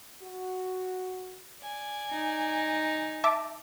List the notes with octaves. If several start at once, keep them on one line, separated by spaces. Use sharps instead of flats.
F#4
D5 G#5
D#4
E5 A5 D6